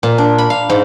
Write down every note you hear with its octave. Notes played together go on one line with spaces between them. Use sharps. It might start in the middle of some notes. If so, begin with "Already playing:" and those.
A#2
D4
B5
F5
G#2